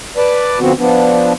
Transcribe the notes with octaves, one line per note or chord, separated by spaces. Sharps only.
B4 D5 A5
B2 D3 F3 B3 C4 F#4
F3 B3 D4